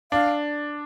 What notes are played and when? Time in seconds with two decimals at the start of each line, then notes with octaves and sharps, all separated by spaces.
0.12 D4 F5